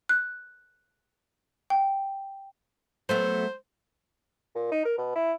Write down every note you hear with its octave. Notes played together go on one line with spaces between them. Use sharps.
F#6
G5
F#3 A3 B3 C5
A#2
D#4
A#4
B2
E4